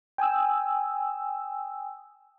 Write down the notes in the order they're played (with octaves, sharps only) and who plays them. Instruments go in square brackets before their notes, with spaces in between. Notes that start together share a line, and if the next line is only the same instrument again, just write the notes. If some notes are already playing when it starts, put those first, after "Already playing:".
[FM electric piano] G5 G#5 D#6 E6